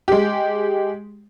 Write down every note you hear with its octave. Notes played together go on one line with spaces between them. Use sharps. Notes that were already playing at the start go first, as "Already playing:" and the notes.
G#3 G4